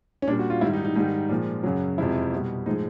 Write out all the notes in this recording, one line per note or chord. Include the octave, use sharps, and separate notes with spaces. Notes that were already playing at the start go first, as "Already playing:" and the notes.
C#4
A#2 G3 D4
F#4
F4
G#2 D#3 G3 E4
D#4
D#4
G#2 D#3 G3 D#4
A#2 F3 G#3
F#2 C#3 F#3
F2 C3 F3 G#3 E4
B2 G3
A2 F3 G#3 D#4